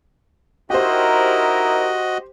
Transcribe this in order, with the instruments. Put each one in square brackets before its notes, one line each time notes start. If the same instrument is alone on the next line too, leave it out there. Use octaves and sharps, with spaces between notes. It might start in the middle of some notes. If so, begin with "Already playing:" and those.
[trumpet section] D#4 E4 A#4 [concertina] F#4 D#5 [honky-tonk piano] G4 C5